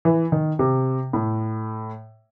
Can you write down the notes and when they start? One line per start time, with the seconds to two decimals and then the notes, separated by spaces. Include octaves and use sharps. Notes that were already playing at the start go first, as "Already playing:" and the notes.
0.05 E3
0.32 D#3
0.59 C3
1.13 A2